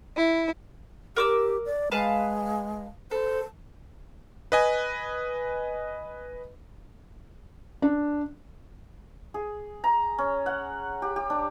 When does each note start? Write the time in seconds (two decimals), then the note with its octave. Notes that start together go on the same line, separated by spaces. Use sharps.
0.16 E4
1.16 G4 A#4 D6 E6
1.66 D5
1.91 G#3 B4 F5 A5
3.11 A4 C5
4.52 B4 D#5 G#5
7.82 D4
9.34 G#4
9.84 A#5
10.18 C#4
10.46 F#5
11.02 G4
11.16 G4
11.30 D4